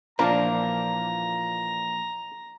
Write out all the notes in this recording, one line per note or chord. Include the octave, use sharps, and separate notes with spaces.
A#2 E3 F3 A#3 D4 A#4 A#5